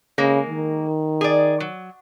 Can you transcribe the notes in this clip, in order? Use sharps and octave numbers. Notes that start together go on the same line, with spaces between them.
C#3 G#3 A#3
D#3
G#4 D5
F#3